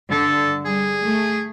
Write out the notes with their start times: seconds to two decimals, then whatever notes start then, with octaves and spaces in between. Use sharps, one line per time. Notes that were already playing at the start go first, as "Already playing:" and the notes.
0.11 G2 D3 A4
0.65 G3 G#4
1.05 A3